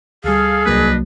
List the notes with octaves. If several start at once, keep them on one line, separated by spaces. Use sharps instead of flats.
D2 G3 G#4 A4 F5
C2 F#3 A#3 D4 B4 D#5